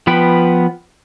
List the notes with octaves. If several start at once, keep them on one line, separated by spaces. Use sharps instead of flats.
F3 B3 B4 G5